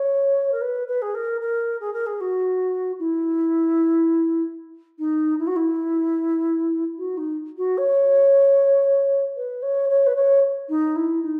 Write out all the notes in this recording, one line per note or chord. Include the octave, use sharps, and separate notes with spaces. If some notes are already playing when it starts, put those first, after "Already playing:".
Already playing: C#5
A#4
B4
B4
G#4
A#4
A#4
G#4
A#4
G#4
F#4
E4
D#4
E4
F#4
E4
F#4
D#4
F#4
C#5
B4
C#5
C#5
B4
C#5
D#4
E4
D#4